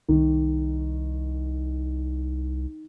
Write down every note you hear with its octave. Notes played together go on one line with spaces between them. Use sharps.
C2 D#3